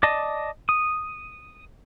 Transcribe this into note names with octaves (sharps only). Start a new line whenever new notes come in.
D5 D#5 A5
D#6